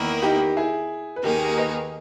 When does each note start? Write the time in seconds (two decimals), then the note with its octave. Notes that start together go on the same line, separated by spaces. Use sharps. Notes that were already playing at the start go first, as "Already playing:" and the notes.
Already playing: E2 D#3 A#3 E4 A#4
0.22 D#4 G4
0.57 E4 G#4
1.16 B4
1.23 D#2 D#3 A#3 D#4 G4 G#4 A#4
1.57 B4 D#5